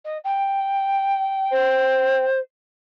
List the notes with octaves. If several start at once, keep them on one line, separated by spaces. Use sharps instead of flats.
D#5
G5
C5